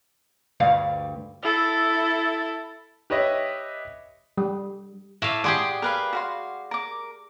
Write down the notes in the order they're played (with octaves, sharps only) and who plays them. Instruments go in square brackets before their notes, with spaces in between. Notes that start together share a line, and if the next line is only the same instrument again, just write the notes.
[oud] D2 G2 F5
[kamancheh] E4 A4
[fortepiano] G4 B4 C#5 D#5 E5
[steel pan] G3
[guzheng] A2 F5 [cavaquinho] E5 D6
[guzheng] G4 G#4 D5 [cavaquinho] F#5 C6 D#6
[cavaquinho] A#4 B4 F5
F#4 F5 C6
A#4 D6